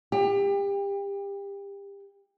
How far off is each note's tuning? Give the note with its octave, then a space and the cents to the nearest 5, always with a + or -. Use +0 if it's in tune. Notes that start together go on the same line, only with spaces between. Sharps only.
G4 +30